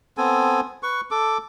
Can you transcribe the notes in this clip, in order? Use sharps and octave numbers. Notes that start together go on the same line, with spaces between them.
B3 C4 A4 G#5
B4 C#6
A4 D6